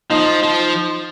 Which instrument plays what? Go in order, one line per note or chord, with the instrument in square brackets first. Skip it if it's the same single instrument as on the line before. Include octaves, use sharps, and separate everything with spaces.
[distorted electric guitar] F3 [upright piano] D#4
[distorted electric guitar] F3